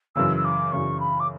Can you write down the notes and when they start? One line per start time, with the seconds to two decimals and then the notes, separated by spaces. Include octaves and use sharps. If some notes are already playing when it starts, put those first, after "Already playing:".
0.15 F#2 C#3 E3 E6
0.37 E6
0.44 D6
0.72 F#2 C#3 E3 C#6
1.00 B5
1.20 D6